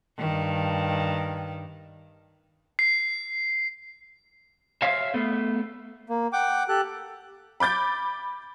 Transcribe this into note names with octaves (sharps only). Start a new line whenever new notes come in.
G2 D#3
C7
C5 C#5 E5 F5
A3 B3
A#3
F#5 G5 D6
G4 A4 F#6
B5 D6 G6 A6